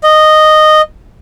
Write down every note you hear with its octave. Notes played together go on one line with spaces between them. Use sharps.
D#5